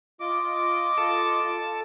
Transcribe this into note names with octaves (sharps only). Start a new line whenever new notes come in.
F4 D#5 D6
A4 A5